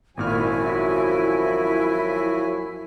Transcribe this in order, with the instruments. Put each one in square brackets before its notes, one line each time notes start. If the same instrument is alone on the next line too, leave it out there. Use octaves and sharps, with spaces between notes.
[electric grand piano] G#1 A#2 F6 [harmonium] F#2 F#4 G#5 [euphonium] F3 [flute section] E4